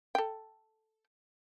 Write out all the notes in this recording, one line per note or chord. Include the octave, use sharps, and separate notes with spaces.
A4 G5